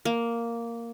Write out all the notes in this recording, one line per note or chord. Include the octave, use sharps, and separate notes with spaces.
A#3